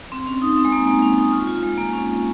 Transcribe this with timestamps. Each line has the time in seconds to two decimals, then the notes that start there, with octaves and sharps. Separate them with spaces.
0.12 C4
0.27 C#4
0.42 D#4
0.58 C4
0.65 G#3
0.72 A#3
0.87 A#3
1.02 C#4
1.17 D#4
1.32 F4
1.47 F4
1.63 G#3
1.78 A#3
1.93 C#4